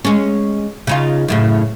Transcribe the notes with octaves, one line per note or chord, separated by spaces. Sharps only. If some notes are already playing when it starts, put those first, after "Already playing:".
G#3 C#4
C#3 D#4 F4
F#2 A2 C#3